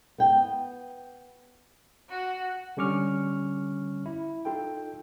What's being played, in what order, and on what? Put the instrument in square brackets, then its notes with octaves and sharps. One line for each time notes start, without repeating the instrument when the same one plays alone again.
[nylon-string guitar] B3 G5
[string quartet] F#4
[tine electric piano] D3 G3 C#4 C#6 D6 F6
E4
D#4 F4 A4 G5